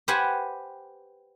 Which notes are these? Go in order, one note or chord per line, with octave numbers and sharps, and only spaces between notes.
G4 B4 C5 F#5 G#5